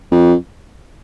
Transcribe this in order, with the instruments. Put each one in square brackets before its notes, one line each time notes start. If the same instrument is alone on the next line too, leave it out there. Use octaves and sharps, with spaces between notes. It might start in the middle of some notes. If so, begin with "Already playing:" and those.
[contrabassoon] F2